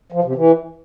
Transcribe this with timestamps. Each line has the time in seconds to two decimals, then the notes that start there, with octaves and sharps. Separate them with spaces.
0.12 F3
0.24 C3
0.36 E3